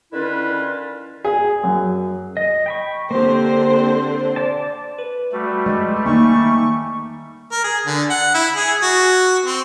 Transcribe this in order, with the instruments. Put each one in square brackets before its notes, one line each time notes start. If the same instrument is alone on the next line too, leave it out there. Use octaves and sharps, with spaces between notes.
[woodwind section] D3 D#3 C#4 E4 F4 B4
[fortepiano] G#4
F#2
[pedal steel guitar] D#5
G5 B5 C#6
[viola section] D3 C4 C5 [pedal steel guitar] A#3 G4
[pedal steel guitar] D5 A5
[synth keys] B4
[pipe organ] G3 A3 [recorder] F#4
[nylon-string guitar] G#3
[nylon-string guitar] D#3 D#4 G#5 [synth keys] A#3 [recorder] C#6
[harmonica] A#4
G#4
D3
F#5
E4
G#4
F#4
C4